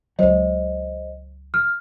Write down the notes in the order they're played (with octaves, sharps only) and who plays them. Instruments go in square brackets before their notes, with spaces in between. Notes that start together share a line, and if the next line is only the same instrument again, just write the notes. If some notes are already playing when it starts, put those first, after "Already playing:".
[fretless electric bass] C#2 F#3 [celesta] C5 D#5
[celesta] F6